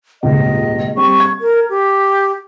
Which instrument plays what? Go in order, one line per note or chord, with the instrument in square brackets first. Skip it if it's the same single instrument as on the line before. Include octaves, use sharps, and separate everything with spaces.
[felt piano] D#1 G#1 C#2 [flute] D#5
[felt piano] G3 C4 [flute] C#6
[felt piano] G#6
[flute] A#4
G4